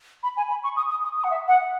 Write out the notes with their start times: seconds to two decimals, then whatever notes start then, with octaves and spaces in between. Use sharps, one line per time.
0.23 B5
0.37 G#5
0.50 B5
0.64 C#6
0.77 D#6
0.90 D#6
1.04 D#6
1.17 D#6
1.24 F#5
1.31 E5
1.48 F#5